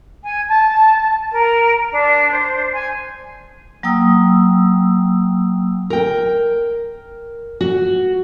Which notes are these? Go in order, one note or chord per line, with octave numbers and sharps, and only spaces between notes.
G#5
A5
A#4
D4
C5
G#5
F#3 A#3 G5 D#6 E6
A#4 G5
F#4